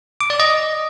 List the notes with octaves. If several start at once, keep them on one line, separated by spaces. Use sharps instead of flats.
D6
D5
D#5